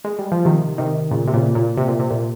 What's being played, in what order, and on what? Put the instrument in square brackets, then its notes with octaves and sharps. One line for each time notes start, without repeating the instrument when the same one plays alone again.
[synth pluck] G#3
G3
F3
C3 D#3
C3 D#3
A#2 C#3
C3
A#2 C#3
A#2
C3
A#2
C3
A#2